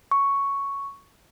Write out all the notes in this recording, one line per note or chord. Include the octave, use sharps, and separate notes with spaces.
C#6